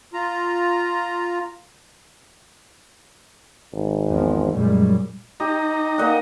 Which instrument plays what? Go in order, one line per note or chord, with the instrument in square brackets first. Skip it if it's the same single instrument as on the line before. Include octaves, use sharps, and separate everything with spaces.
[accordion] F4 A#5
[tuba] G#1
[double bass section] E2 F3
[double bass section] F#2 A#2 G3 [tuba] G#3
[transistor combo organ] D#4 A#5 [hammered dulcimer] G4
[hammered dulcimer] A#3 D#5 F#5